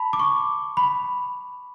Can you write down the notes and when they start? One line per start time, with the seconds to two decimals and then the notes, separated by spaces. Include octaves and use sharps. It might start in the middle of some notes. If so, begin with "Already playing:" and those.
Already playing: A5 B5
0.13 D6
0.19 C#6
0.77 B5